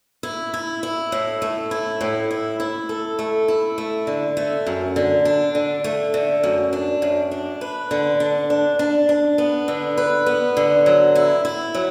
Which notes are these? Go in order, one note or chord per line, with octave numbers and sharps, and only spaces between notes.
E4
E4
E4
A2
A3
E4
A2
E4
E4
A4
A3
E4
A3
D3
A3
F#2
D3
D4
D3
A3
D3
F#2
D4
F#2
D4
B4
D3
D4
D4
D4
D4
B3
D3
B4
B3
D3
F#3
E4
E4
F#3